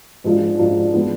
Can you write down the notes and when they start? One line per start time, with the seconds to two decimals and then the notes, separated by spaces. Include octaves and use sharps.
0.24 G#2 F3 G#3 D4 F4
0.59 G#2 F3 G#3 D4 F4
0.93 F3 G#3 B3